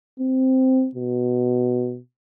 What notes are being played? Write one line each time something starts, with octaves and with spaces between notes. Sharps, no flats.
C4
B2